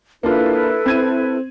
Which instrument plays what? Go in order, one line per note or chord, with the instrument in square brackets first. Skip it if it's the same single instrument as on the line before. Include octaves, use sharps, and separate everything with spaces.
[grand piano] A#3 D4 F4 [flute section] E4 A4 B4
[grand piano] C4 G#6 D#7